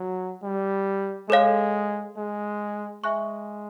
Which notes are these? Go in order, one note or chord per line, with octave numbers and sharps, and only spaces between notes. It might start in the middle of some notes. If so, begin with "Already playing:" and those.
Already playing: F#3
G3
G#3 A4 C#5 F5
G#3
G#3 E5 G#5 C#6 F#6